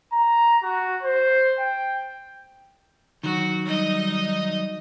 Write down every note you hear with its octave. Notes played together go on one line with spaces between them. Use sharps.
A#5
F#4
C5
G5
D#3 F#3 F#4
G3 D#4 D#5